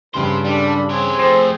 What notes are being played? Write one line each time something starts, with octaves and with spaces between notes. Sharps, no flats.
G2 C#3 G4 B4 C5 C6
G3 D4 A4 B5
C4 G4 G#4 C#5
F3 A3 C5 A#6 C7 E7